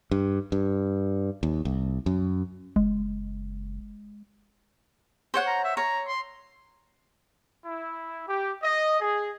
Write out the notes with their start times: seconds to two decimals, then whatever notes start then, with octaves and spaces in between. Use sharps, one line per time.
0.11 G2
0.52 G2
1.43 D#2
1.65 C2
2.06 F#2
2.76 F#1 G#3
5.34 C5 C#5 F#5
5.47 A#5
5.64 E5
5.77 C#5 A#5
6.08 C6
7.65 E4
8.27 G4
8.63 D#5
9.00 G#4